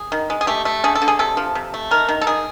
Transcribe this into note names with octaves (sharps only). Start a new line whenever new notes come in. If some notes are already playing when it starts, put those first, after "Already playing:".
Already playing: G#4
D#3
G#3
G#4
A3 G4
A3
D3 G#4
A4
D3
G#4
C3 A4
F3
C3
A3
D#3 A#4
D#3
A4
D#3 G#4